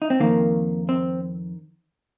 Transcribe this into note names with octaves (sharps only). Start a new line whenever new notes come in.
D#4
C4
F2 D#3 A#3
C4